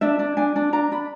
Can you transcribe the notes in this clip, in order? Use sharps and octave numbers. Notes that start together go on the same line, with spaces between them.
D4 E5
D4
D4 G#5
D4
D4 A#5
D4 B5